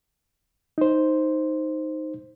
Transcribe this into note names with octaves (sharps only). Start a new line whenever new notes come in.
D#4 C5